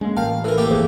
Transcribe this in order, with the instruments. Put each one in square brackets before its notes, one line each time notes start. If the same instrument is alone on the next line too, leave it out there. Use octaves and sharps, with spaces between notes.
[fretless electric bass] G#3 [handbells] A#3 C#4
[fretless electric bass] A1 [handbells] A#4 G5 A5 [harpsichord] F5
[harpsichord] E3 A#4 [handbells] A4
[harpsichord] A3 A#3 G4
[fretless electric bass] D1 G1 E3 [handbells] G#4 C5